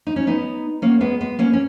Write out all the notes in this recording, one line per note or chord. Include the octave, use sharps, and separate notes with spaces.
D#4
C#4
B3 D#4
A#3 C#4
G#3 B3
G#3 B3
A#3 C#4
C#4